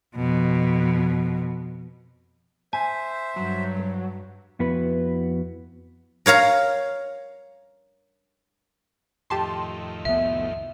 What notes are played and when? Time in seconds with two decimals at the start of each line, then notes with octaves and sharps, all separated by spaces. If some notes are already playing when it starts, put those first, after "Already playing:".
0.15 F2 B2
2.73 C5 E5 G#5
3.36 G2 F#3
4.59 F2 B3 E4 F#4 B4
6.26 A#4 C#5 F5 A#5
9.30 F2 A2 D#3 G4 A5 C6
10.05 C2 B3 E5